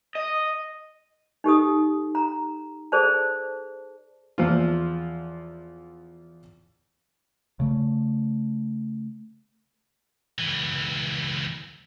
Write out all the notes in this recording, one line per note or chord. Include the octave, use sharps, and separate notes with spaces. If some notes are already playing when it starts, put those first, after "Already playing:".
D#5
D#4 G4 A4 D#6
A#5
G#4 A4 C5 D5 A5
E2 F3 F4
C#3 A3
C#2 E3